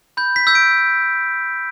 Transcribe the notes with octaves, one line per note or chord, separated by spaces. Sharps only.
B5 G6
B6
E6 G6
D7